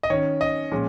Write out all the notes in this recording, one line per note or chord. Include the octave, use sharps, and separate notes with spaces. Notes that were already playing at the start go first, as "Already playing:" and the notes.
D#5
D#3 C#4 C#5
D#5
A#2 F3 G#3 C#4